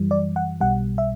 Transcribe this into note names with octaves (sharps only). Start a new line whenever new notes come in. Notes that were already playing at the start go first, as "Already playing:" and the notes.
Already playing: F#2 E3 G3
D5
F#5
B1 B2 G3 F#5
E5